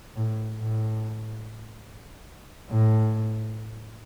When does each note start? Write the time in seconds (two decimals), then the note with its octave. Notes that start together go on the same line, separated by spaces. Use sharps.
0.16 A2
0.59 A2
2.69 A2